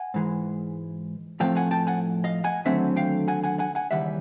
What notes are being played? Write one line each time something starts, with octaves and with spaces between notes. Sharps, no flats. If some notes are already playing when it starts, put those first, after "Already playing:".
Already playing: F#5 G#5
G#2 E3 G#3
A2 F3 A3 C4 F5 G5
F#5 G#5
G5 A5
F#5 G#5
D#5 F5
F#5 G#5
D#2 D3 F#3 A3 C4 E5 F#5
F5 G5
F#5 G#5
F#5 G#5
F#5 G#5
F#5 G#5
D#2 C#3 E3 G3 E5 F#5